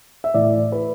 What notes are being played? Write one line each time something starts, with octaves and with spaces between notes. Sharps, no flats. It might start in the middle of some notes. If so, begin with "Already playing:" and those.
E5
A2 E3 D5
B4